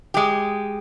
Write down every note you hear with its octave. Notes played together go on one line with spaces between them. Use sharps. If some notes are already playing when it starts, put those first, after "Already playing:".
G#3 G4